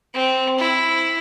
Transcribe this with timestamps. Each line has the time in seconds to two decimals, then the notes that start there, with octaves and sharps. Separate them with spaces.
0.14 C4
0.59 E4